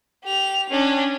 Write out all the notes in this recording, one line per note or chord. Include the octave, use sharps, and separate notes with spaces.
G4 F7
C#4 D4